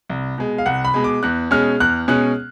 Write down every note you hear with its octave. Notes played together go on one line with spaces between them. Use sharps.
C2
B2 G#3
F5
C2 F#5
B5
B2 G#3
D6
E2 F#6
B2 G#3 C#4 F6
E2 F#6
B2 G#3 C#4 F#6